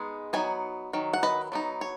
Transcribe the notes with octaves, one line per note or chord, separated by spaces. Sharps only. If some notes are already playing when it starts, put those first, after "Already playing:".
Already playing: G#3 B3 D#4
F#3 B3 D#4 G#5
D#3 F#3
F#5
B4 D#5
F#3 B3 D#4
C#5